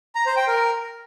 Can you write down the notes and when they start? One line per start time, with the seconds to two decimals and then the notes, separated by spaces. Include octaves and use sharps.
0.15 A#5
0.26 C5
0.37 G5
0.47 A#4